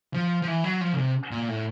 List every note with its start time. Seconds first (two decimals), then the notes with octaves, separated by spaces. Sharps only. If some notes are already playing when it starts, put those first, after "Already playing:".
0.14 F3
0.42 F3
0.47 E3
0.64 F#3
0.81 F3
0.93 C#3
0.98 C3
1.31 A#2
1.49 A2